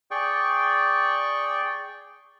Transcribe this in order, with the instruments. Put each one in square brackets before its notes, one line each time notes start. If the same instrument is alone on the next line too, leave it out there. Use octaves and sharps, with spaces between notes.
[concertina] G#4 D5 G5 C#6